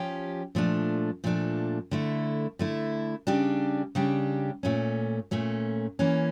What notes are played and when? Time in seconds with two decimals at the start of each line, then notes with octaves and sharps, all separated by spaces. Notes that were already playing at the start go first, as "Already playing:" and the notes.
Already playing: F3 C#4 G4
0.55 A#2 F3 A3 D4
1.24 A#2 F3 A3 D4
1.91 D3 A3 E4
2.59 D3 A3 E4
3.27 C#3 G3 D4 G4
3.95 C#3 G3 D4 G4
4.63 A#2 A3 C#4
5.31 A#2 A3 C#4
5.99 E3 A#3 C#4